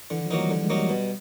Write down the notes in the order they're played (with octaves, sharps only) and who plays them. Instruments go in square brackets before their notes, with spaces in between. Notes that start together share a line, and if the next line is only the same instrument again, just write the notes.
[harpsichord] D3 [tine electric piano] E3
[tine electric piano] D#3
F3
[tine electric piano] E3 [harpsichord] F#3 A#3 D#4
[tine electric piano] G3
[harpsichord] D3
[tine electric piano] G#3
[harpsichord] F#3 A#3 D#4
[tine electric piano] G3
[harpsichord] B2